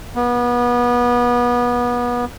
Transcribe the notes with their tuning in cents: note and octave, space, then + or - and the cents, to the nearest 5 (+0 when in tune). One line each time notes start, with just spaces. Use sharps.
B3 -25